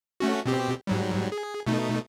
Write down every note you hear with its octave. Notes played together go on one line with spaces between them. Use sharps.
A3 C#4 F#4
B2 C4 G4
G#2 F#3 G3
G#4
B2 A3 D#4